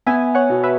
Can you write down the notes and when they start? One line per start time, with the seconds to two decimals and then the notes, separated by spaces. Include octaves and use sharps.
0.06 B3 E5 G#5
0.35 C#5 F#5
0.50 B2
0.64 B4 E5